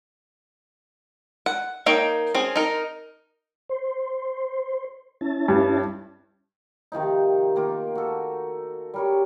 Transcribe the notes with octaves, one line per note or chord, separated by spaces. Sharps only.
F#5
A#3 D#4 C#5 G5
C4 C#4 G#4
D#4 A#4
C5
C#4 E4 A5
G2
C3 D#3 F3 D#4
D#3 A#3 F4
F#4 A4
G3 A#4 C#5